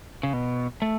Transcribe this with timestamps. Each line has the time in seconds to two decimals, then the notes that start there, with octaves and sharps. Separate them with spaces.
0.23 C#3
0.33 B2
0.82 A3